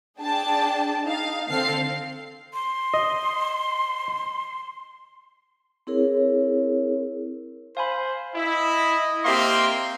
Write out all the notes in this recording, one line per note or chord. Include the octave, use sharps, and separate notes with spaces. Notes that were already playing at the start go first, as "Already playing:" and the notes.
D4 G#4 G5 A5
D#4 F5
D3 C4 A4 F5 F6 C7
C6
D#5
C4 E4 G#4 A#4 C#5
C5 F5 G#5 B5
E4 D#5
A#3 C4 G4 E5 F5 C6